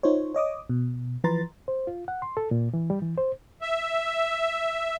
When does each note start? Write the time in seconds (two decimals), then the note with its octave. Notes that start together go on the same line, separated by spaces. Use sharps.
0.03 D#4 F4 C5 C#5
0.34 C#5 D#5 D6 D#6
0.69 B2
1.24 E3 F3 B4 A#5 C6 A6
1.68 C5
1.87 F4
2.08 F#5
2.22 C6
2.37 A4
2.51 A#2
2.74 E3
2.90 G3
3.02 E3
3.18 C5
3.61 E5